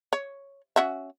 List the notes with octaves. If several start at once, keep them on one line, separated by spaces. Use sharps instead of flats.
C#5
C#4 F#4 E5